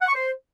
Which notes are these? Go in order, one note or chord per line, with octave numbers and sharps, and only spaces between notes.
F#5
C#6
C5